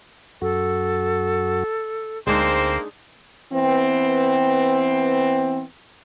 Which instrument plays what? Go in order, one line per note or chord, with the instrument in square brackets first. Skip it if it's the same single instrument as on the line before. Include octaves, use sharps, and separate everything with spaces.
[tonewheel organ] F#2 F#4 [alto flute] A4
[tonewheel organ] D2 [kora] G#3 D4 D#4 [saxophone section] A#3 C4 C5
[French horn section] E3 B3 C4